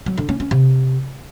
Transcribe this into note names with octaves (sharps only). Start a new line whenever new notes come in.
F#3
D3
C#4
C#4
C3